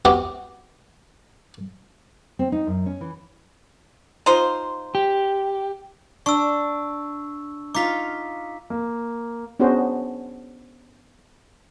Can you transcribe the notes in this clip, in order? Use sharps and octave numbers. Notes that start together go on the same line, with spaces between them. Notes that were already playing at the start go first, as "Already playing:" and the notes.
C3 B3 F#4 G4 D6
C4
D#4
F#2
C#4
E3
D#4 F4 C5
G4
D4 C#6 E6
D#4 F4 F5 D6 B6
A#3
B3 C#4 D4 F#4 G#4 C5